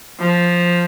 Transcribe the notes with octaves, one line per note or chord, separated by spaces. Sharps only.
F3